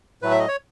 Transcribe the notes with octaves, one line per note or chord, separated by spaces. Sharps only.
A2 F#3 A3 B4
E5
D#5
C#5